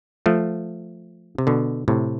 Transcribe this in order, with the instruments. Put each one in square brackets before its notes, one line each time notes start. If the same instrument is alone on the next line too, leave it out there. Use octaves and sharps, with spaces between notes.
[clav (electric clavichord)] F3 A3
C3
B2 D3
A2 C3